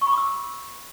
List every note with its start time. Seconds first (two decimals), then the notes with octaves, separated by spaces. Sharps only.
0.01 C#6
0.07 B5
0.12 D6
0.18 E6